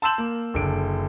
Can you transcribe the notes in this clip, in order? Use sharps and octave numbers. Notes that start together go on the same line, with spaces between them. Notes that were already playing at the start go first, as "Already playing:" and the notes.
A5 C6 E6 G6 E7 F#7
A#3
F#1 D3 D7